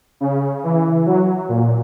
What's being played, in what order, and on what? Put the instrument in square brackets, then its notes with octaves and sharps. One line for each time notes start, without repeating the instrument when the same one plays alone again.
[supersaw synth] C#3
E3
F#3
A#2